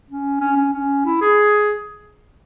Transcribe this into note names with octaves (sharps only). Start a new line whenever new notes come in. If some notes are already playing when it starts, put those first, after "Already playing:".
C#4
C#4
C#4
C#4
E4
G#4